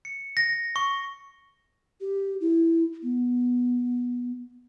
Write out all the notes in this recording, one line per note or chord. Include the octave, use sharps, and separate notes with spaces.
C#7
A#6
C#6
G4
E4
B3